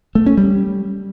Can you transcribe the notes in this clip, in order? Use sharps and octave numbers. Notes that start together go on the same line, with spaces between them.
A3
C#4
G3